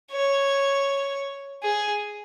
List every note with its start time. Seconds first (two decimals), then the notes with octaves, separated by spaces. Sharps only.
0.12 C#5
1.64 G#4